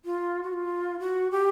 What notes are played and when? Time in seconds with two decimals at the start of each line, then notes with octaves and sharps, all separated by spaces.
0.05 F4
0.43 F#4
0.53 F4
1.00 F#4
1.31 G4